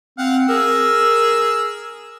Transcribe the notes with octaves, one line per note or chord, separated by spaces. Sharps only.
C4 F5 F#5
G#4 A#4 E6